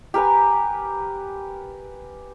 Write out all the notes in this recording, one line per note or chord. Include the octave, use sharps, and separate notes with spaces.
G4 A#4 B4 G#5